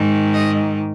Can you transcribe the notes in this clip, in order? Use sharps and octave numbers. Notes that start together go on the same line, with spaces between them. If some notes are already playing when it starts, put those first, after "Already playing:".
Already playing: G#2 D#3
D#5